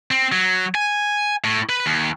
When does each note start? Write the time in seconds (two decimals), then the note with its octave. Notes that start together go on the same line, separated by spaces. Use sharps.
0.11 C4
0.32 F#3
0.75 G#5
1.44 A2
1.69 B4
1.86 D#2